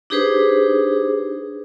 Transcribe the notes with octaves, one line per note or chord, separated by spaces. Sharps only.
D4 D#4 G4 G#4 B4 C5